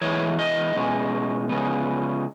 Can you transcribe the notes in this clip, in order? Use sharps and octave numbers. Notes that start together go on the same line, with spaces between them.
E3 G#3 B3 C#5
D#5
B2 G#3 C#4
C#3 G#3 B3